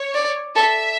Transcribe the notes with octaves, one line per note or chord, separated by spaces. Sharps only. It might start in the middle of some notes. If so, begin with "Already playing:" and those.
Already playing: C#5
D5
A4 E5